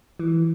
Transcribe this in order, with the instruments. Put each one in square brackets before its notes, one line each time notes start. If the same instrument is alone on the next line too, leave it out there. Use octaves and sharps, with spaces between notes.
[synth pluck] E3